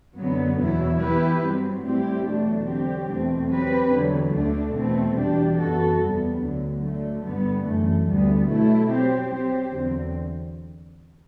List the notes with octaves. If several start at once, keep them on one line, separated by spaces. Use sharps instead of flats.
F#2 D3 F#3 B3
E2 B2 F#3 B3 E4
E3 B3 E4 G4 B4
G2 F#3 C4
A2 G3 C4 E4 G4
E2 B2 F#3 A3 D4
D3 F#3 C4 G4
E2 B2 A3 C4
F#3 C4 G4 B4
E2 D3 F#3
D2 D3 A3 D4
E2 B2 A3 C4
E2 B2 G3 D4 G4
F#2 E3 B3 F#4 A4
E2 C3 G3 B3
D2 D3 F#3
D3 F#3 A3
G2 D3 G3 B3
F#2 E3 A3
D2 D3 G3 B3
B2 F#3 A3 E4
F#3 C4 G4 C5
F#3 C4 G4 C5
E2 D3 F#3 C4